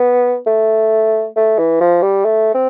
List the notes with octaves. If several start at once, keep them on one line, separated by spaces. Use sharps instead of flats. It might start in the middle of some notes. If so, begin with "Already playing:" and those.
Already playing: B3
A3
A3
E3
F3
G3
A3
C4